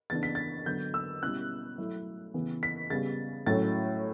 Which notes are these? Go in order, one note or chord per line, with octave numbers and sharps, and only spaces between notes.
C#3 E3 B3 D4 A6
B6
A6
D3 F#3 B3 G6
E6
B2 G3 C#4 E4 F#6
F#3 A3 E4
C#3 E3 B3
B6
C#3 G3 B3 A6
A2 F#3 A3 C#4 A6